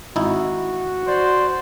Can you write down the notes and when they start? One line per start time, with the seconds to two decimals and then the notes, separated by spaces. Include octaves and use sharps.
0.16 G#1 D#4 E4 F#4
1.07 C5 D5